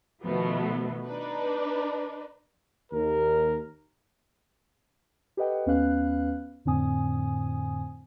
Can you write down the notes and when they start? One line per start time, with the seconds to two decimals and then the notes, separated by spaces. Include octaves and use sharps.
0.22 B2 D#3 F3 A3 B3
1.06 D4 D#4 B4
2.91 D#2 A#4
5.37 G4 A4 B4 D#5 F#5 G5
5.66 D#2 B3 C#4 B4 F5 F#6
6.65 F2 A2 D3 C4 G#5 D#6